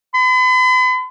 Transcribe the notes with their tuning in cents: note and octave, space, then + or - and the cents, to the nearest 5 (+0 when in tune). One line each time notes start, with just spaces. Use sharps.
B5 +45